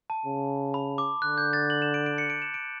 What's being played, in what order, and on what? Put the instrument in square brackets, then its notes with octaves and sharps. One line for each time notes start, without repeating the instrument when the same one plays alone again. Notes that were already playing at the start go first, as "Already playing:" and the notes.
[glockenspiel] A5
[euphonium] C#3
[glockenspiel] B5
D6
[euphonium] D3 [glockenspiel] F#6
[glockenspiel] G6
A6
F#7
E7
D7
D7
C#7
D7
E7
D7